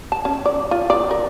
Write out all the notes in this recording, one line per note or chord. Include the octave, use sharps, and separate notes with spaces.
A5
C#4
D5
F4
D5
A#4